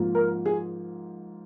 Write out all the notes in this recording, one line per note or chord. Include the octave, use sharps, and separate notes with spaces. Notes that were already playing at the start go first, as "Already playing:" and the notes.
Already playing: G#2 F3 A#3
A#4
G#4